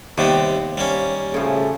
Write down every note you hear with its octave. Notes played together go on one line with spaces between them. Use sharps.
D#2 C3 G3 B3 C4
G3 A#3 C#4
A2 C#3 F3 A3 G#4